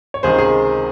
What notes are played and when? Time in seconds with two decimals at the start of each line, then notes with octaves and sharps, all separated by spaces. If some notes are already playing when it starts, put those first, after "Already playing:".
0.14 C#5
0.23 C#2 C3 D#3 G#4 C5
0.38 G#4